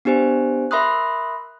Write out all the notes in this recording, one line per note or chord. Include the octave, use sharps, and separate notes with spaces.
B3 D4 G4 C5 G#5
A#4 E5 B5 C6 D#6 F#6